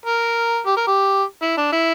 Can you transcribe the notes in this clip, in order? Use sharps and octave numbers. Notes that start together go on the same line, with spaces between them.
A#4
G4
A#4
G4
E4
D4
E4